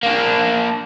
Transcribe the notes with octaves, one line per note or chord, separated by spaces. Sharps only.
A#3 D4